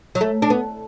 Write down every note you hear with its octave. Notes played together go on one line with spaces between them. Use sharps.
F#3
A3
D4
B3